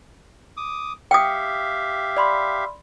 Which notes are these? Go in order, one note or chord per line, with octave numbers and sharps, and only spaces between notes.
D6 D#6
G4 E5 F5 G5 D#6
D5 B5 C6